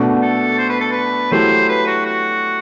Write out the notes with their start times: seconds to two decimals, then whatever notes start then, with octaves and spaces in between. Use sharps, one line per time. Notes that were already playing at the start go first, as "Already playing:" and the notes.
Already playing: B2 A3 D4 F#4
0.22 A4
0.59 C5
0.70 B4
0.80 A4
0.92 B4
1.31 F#3 A3 E4 G4 C5
1.69 B4
1.87 F#4
2.06 F#4